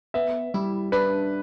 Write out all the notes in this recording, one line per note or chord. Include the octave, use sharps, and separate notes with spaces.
B3 E5
G3 E4
D4 B4